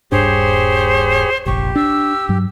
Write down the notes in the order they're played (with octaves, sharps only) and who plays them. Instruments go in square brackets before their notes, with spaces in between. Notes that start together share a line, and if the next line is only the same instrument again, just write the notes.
[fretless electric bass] D#1 G2 D4 [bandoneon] G4 G#4 C#5 [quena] C5
[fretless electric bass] F1 A#1 [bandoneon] G4 [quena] C#6
[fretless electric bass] D4 [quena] E6
[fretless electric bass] G2 F#3